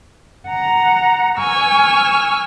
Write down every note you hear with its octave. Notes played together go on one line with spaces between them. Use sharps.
F#5 A#5
G#5 C#6 E6 F6